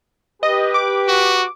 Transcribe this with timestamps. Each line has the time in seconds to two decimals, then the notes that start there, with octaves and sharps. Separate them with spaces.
0.43 G4 B4 D#5
0.74 D6
1.08 F#4